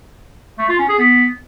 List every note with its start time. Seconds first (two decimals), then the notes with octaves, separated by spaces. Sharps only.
0.59 A3
0.69 F4
0.79 C#4
0.89 G#4
0.99 B3